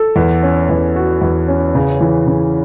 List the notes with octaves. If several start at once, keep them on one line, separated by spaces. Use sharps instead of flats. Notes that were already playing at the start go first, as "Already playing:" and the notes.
Already playing: A4
E2
C#4
E2
F#4
E2
C#4
C#3
E3
C#3